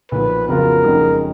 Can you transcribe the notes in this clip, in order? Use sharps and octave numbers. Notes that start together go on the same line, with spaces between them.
B1 A#2 F3 B3 B4
F2 C#3 F#3 B3 F4 A#4
F#1 F2 C#3 G#3 D#4